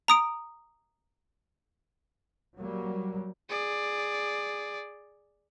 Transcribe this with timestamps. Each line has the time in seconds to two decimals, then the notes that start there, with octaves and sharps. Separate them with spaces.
0.08 A#5 D#6 D7
2.58 F#3 G3 A#3
3.50 G#4 D5